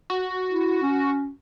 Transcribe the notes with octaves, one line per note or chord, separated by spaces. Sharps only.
F#4
E4
C#4